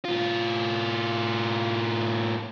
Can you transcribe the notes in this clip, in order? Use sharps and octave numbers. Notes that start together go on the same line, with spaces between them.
A2 F4